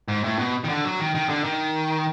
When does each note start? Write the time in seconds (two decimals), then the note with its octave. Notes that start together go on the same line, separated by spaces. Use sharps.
0.08 G#2
0.24 A2
0.39 B2
0.64 D#3
0.69 D3
0.84 F#3
1.00 D#3
1.15 D#3
1.29 D3
1.44 D#3